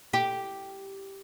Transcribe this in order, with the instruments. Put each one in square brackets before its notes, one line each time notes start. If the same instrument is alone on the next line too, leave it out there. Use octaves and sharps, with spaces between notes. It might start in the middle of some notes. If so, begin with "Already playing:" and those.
[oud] G4